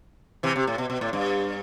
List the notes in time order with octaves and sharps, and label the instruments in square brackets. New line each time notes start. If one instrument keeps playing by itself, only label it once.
[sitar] C3 E3
C3
A2
B2
B2
A2
G2